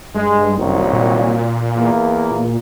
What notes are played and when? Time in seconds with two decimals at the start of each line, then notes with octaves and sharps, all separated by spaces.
0.15 G2 G#3
0.58 F#1 C2 D#3 F#3
0.93 A#2
1.76 E2 A#3
2.31 A#2